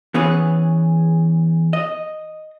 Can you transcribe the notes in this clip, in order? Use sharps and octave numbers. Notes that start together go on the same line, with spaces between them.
E3 B3 C#4 G#4 B4
D#5